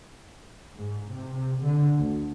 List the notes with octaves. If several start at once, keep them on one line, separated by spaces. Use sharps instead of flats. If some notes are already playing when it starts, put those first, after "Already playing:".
G#2
C3
D3
D2